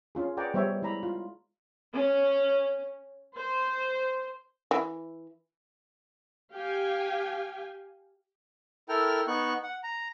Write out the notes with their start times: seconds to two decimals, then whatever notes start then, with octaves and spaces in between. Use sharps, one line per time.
0.15 C#4 F4 G#4
0.37 G#4 B4 D5 F#5 G5 A#5
0.54 G3 B3 C5 C#5 E5 G5
0.82 G#3 E4 D5 A#5 B5
1.03 F4
1.93 C#4
3.36 C5
4.71 E3
6.52 G4 F5 G5 G#5
8.89 E4 A4 A#4 G5 F6
9.28 B3 D#4 C#6 F#6
9.63 F#5
9.83 A#5